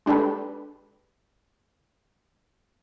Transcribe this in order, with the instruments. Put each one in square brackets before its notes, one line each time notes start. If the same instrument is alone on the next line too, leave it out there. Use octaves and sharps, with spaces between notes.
[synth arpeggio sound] G#3 D4 G4 A4 B4